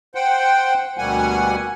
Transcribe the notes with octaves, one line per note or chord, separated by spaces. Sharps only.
C5 F#5 G5
D2 B2 G3 A#3 F#5 G#5